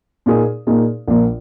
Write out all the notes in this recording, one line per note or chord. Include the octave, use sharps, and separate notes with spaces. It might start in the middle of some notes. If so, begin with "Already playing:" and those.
A#2 A#3 D#4 G#4
A#2 A#3 D#4 G#4
A#1 A#2 A#3